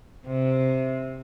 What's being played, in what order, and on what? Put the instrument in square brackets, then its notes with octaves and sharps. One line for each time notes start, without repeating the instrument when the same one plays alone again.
[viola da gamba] C3